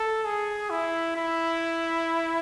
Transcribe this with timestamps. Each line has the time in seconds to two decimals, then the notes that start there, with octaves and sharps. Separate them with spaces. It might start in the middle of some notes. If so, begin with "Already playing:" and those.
Already playing: A4
0.25 G#4
0.70 E4
1.16 E4